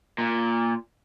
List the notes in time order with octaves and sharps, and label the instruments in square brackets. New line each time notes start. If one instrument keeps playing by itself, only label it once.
[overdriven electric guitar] A#2